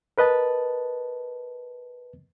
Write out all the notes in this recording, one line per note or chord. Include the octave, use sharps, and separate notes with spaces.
A#4 B4 D#5 A5